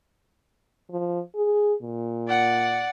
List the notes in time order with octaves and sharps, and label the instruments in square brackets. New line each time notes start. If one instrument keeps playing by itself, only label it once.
[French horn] F3
G#4
A#2
[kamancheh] D5 F#5